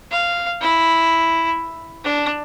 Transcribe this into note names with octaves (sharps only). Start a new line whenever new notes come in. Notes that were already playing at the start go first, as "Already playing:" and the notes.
F5
E4
D4